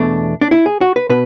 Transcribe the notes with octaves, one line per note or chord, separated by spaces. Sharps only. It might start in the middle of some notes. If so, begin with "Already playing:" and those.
Already playing: E2 B2 A3 D4
D4
E4
G#4
F#4
B4
B2 B4